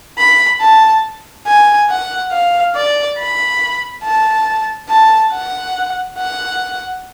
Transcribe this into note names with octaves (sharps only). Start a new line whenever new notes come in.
B5
A5
G#5
F#5
F5
D5
B5
A5
A5
F#5
F#5